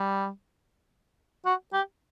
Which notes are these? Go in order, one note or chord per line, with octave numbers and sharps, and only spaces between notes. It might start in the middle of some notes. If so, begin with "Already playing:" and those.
Already playing: G3
F#4
G4